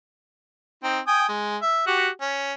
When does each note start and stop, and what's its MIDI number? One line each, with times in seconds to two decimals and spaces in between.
0.84 0.99 60
0.84 0.99 63
1.07 1.27 79
1.07 1.27 80
1.07 1.27 87
1.29 1.57 56
1.62 1.86 76
1.87 2.09 66
1.87 2.09 67
2.21 2.53 61